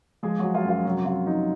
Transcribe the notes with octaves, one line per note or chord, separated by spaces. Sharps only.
F3 G#3 G#4
F3 F#3 F#4
F4
F#2 F4
C3 F#3 F#4
F#4
C3 F4
F3 D#4